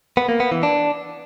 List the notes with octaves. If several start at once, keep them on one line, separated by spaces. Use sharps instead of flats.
B3
A#3
B3
E3
D4